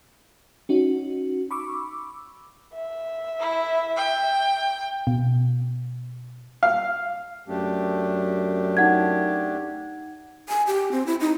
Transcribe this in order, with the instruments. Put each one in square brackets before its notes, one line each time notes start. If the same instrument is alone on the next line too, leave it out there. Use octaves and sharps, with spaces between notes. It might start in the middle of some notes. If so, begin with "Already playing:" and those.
[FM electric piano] C#4 D#4 F#4
B5 C#6 D6 E6
[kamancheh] E5
[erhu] E4
G5
[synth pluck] B2
[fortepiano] F5
[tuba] F#2 [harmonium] A3 D4 G4
[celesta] D#4 F#5 G#6
[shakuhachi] G#5
G4
C4
E4
D#4